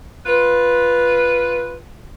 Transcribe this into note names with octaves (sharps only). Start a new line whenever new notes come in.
F4 B4